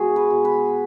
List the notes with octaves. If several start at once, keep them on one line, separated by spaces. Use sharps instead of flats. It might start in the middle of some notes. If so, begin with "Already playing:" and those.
Already playing: B2 G#3 F#4 G#4
B4
B2
B4